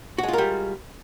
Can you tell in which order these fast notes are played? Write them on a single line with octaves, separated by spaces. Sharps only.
F#4 G#3 F4 A#4 G3